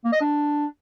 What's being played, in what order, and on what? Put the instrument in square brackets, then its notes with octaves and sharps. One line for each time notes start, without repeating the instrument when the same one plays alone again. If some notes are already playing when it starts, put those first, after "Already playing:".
[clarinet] A#3
D#5
D4